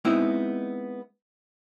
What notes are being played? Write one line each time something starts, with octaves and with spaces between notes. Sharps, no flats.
G#3 B3 C4 D#4 E4 E5